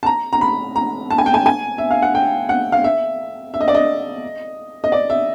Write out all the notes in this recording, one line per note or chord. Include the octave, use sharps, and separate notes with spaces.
A5
A#5
A#5
B5
A#5
A5
G#5
G5
G#5
G#5
E5
F5
F#5
G5
F#5
F5
E5
E5
D#5
D5
D#5
D#5
D5
E5